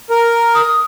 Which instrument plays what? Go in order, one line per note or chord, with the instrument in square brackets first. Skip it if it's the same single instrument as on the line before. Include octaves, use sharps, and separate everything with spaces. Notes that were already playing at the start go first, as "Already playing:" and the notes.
[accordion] A#4
[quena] D#6